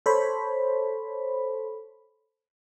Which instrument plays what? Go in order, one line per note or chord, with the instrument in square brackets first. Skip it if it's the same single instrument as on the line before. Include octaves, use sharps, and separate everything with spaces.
[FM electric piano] A4 C5 C#5 B5